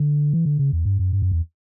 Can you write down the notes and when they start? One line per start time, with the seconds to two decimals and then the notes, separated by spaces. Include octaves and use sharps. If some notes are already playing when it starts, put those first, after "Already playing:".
Already playing: D3
0.33 E3
0.45 D3
0.59 C#3
0.72 E2
0.85 G2
0.99 F#2
1.13 G2
1.22 F#2
1.32 E2